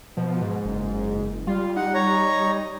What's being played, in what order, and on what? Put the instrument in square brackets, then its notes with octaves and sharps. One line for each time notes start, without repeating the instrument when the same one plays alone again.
[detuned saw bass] B2 [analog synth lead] F3
[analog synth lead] G#2
[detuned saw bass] F#1
[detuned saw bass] G3 [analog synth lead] F4
[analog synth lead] D#4 [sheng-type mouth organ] F#5
[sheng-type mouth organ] C#5 A#5